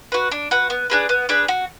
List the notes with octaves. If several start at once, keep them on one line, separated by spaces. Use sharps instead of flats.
F#4 B4
D4
F#4 B4
B3
D4 G#4 B4
B3
D4 G#4 B4
F#4